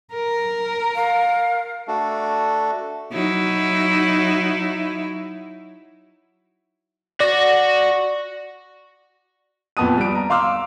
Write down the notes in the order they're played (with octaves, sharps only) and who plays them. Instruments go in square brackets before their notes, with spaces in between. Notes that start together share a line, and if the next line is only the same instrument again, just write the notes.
[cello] A#4
[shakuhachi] F5
[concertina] A3 D4 F#4 A4
[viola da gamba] F#3 D#4 E4
[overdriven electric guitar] F#4 [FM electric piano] D5 A#6
[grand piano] F2 A#2 B3 A5 D#6 D#7
G3 D7
A#5
F5 C6 D6 E6 F6